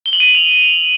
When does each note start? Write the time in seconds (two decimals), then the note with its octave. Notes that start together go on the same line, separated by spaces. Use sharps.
0.06 G7
0.13 F#7
0.20 D#7
0.28 F#7
0.35 F7